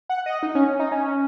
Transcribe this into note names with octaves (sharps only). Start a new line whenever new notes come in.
F#5
D#5
D#4
C#4
D#4
C#4